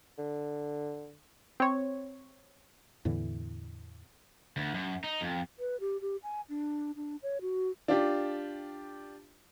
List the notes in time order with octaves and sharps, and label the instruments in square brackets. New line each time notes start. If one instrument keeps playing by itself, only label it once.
[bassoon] D3
[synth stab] C4 C#5
[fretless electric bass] E2 A2 D3 E3
[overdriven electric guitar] D2
F#2
D#4
F2
[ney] B4
G4
G4
G#5
D4
D4
C#5
F#4
[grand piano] D4 F4 G4